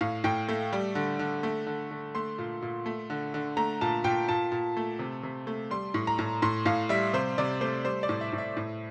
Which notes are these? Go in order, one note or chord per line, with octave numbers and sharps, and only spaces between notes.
A2 F5
A2 G5
A3
G3
D3
D3
A3
D3
D3
A3 C6
A#2
A#2
A3
D3
D3
A3 A#5
A#2 A5
A#2 G5
A#2 A5
A#2
A3
C3
C3
A3
G3 C6
A2
A#5
A2
A2 C6
A2 F5
G3 E5
C3 C5
C3 D5
A3 C5
G3 C5
D5
A2
E5
A2
E5
A2